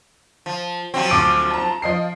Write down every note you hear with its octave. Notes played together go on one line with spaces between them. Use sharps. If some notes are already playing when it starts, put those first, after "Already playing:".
F3
F3 F#3 C4
D2 D6 D7
A5 A#5
F3 D#5 C7